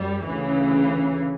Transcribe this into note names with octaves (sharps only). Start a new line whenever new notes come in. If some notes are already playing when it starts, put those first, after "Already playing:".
Already playing: F#2 G3
D2 C#3 E3